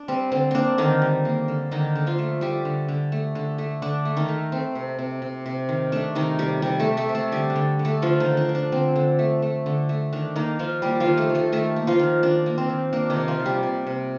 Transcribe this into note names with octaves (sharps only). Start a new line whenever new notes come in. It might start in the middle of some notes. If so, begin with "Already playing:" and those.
Already playing: D4
G3 C4
D3 C4
A#3 C4 D4
D3 D#3 D#4
G3
A#3
D3
D3 D#3 D#4
D3
F3 F4
A3
G3 A3 G4
D3
D3
A3
D3
A3
D3 D4
A3
D#3 D#4
A3
A3 C4
C3
C3
C3
C3
D#3
A3 D4
C3 D#3 D#4
C3 G3 G4
C3 G3 G4
A3 A4
C3
A3 A4
C3
A3 A4
D3 G3 G4
D4
D3
D3
A3 A4
D3 F3 F4
D#3 D#4
D3
D4
F3
D4
D3 C4
D3
A3
A3
D3
A3
D#3 D4
D#3 A#3 D#4
D#3 F3 F4
G3 A#3 G4
F3 F4
D#3
A3 A4
D#3
A3 A4
D#3 A3 A4
A#3
F3 F4
D#3
D#3 D4
A#3
C4
D#3
A#3 D4
D#3 D#4
C3
F3 F4
C3
G3 G4
C3
C3